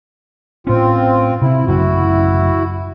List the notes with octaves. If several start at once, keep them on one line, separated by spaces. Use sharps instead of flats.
A2 C4 C#4 F4
C3 C4 E4
A1 F#2 C#3 E4 F#4